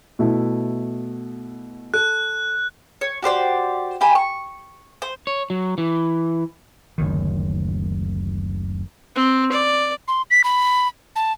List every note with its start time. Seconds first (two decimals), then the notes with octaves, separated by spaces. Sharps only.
0.19 B2 A3 E4
1.94 A4 F#6
3.01 C#5
3.23 F#4 G4 C5 D5
4.01 G4 G5 G#5 B5
4.15 C#6
5.02 C5
5.27 C#5
5.50 F#3
5.78 E3
6.98 F#1 D2 D#3
9.16 C4
9.52 D5
10.08 C6
10.31 B6
10.44 B5
11.16 A5